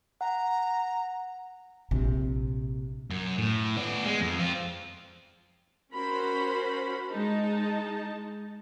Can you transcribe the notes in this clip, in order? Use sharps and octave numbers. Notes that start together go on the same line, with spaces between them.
F#5 A#5
A#1 C3
F#2
A2
B3 D5
G#3
F2
C4 F4
C#4 F#4 A#4 C5 B5
G#3 D#4 A5